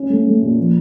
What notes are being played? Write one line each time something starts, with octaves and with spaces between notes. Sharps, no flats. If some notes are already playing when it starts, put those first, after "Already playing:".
Already playing: C#4
A3
A3
A#2
F3